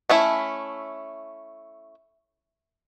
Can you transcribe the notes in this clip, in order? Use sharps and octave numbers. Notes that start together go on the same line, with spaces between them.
A3 C#4 E4